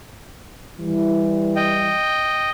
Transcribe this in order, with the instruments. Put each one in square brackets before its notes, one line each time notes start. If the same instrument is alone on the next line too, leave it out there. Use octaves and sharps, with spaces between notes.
[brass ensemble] E3 G3
[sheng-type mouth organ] D#5 G5